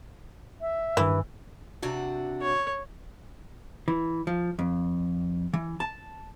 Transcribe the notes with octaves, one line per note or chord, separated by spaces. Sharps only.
E5
G2 D#3 E3
C3 D4 F#4
C#5
E3
F3
F2
E3
A5